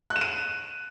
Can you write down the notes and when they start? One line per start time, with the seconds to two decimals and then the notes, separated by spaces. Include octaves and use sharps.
0.10 F#6
0.16 E7
0.21 D#7